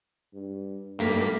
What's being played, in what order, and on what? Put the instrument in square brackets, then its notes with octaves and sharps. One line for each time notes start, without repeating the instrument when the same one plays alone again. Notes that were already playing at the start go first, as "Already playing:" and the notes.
[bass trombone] G2
[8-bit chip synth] G2 A#3 B6 [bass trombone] A3